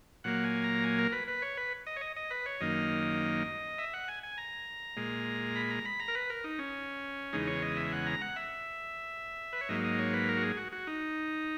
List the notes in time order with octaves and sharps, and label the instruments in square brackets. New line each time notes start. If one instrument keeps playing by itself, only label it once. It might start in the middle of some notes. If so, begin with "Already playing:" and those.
[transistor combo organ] A#2 F#3 A#3 F#5
G#5
A#5
G#5
A#4
B4
B4
C#5
B4
D#5
C#5
D#5
D#5
B4
C#5
F#2 D#3 A#3 D#5
E5
F#5
G#5
G#5
A#5
A#2 G#3
B5
A#5
B5
A#5
A#4
B4
A#4
D#4
C#4
E2 C#3 G#3 D#4
C#5
D#5
E5
F#5
A#5
F#5
E5
B4
C#5
G#2 F#3 A#3 D#5
D#5
C#5
B4
A#4
F#4
G#4
F#4
F#4
D#4